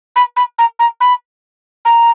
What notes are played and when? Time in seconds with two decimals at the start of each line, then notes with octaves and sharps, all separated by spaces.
0.16 B5
0.36 B5
0.58 A#5
0.79 A#5
1.00 B5
1.85 A#5